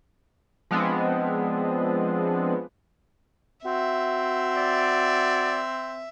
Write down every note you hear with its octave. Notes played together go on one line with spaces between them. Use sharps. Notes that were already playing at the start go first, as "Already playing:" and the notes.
F3 G#3 B3 C4 D4
C4 F#4 E5
D5